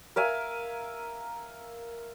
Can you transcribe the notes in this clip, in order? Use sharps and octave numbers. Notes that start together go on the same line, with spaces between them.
A#4 E5 F5 G#5